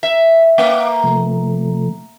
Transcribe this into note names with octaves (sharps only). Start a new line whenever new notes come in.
E5
A#3 F5 F#5 D6
C3 F3 A3